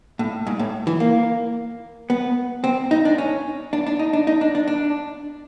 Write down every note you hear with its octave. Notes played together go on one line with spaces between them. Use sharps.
A2
G#2
A2
E3
A#3
B3
C4
D#4
D4
C#4
D4
D4
D#4
D4
D#4
D4
D4
D4